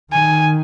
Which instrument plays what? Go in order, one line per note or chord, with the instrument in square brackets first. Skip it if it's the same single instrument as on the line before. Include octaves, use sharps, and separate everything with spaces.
[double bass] D#3 [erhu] G#5